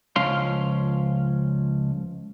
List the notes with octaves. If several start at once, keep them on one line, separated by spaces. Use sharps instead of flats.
C#2 F3 C#4 F5 C6